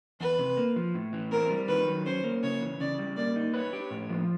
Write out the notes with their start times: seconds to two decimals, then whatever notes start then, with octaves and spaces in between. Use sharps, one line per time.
0.20 E2 B4
0.39 C3
0.57 A#3
0.76 F3
0.94 A2
1.13 E3
1.31 C4 A#4
1.50 G3
1.68 D#3 B4
1.87 F#3
2.06 C#4 C5
2.24 A#3
2.43 C#3 C#5
2.62 E3
2.80 C#3 D5
2.99 G3
3.16 A#3 D5
3.36 D#4
3.54 B4 C#5
3.73 G4
3.91 A2
4.09 F3